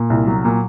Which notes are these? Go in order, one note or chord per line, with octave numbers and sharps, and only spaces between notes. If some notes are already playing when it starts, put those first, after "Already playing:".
Already playing: A#2
C2
F#3
A#2